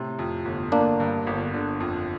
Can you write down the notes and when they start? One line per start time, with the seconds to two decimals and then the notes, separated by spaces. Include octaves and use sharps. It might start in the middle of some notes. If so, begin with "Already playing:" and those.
Already playing: A2 C3
0.19 F2
0.45 G1
0.72 D3 A#3 D4
1.00 G2
1.27 G1
1.54 D3
1.80 F2